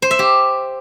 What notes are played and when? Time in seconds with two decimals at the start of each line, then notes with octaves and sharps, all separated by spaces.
0.02 C5
0.11 E5
0.19 G4